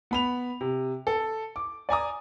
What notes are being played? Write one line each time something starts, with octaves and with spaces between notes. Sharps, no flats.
B3 B5 F7
C3
A4
D6
D5 G#5 A#5 D#6